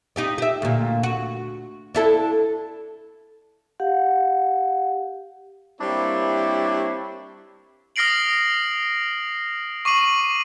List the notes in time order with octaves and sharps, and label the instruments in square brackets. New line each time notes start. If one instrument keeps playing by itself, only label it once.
[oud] D#4 G4 D5
G4 E5
D2 A#2
F#4
D4 E4 A4
[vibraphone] G4 F5 F#5
[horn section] G3 A#3 C4 D4 E4 C#5
[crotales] D#6 F6 A#6 C7 D7 F#7
C#6 D6 C7 D#7 F#7